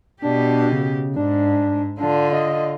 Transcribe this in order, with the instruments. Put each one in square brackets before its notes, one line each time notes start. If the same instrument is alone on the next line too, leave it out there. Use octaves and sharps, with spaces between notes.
[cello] B2 G4 [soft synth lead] D4
[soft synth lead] C#3
[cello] G#2 [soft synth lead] D4
[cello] D3 F4 [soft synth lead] D4
[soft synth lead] D#5